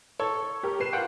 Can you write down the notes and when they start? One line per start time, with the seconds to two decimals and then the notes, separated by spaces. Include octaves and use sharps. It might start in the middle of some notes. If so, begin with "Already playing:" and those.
0.19 A4 C#5
0.63 G4 A#4
0.80 B4 C7 E7
0.93 F4 F#5 G5